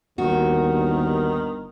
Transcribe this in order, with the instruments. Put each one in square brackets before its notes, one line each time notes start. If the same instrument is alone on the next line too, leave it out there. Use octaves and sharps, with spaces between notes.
[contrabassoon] G1 [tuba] D#2 [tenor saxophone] D#3 [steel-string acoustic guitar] F#4